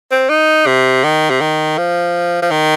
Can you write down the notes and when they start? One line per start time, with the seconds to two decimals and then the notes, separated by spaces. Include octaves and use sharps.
0.12 C4
0.30 D#4
0.67 C3
1.04 D#3
1.30 C3
1.41 D#3
1.78 F3
2.42 F3
2.51 D#3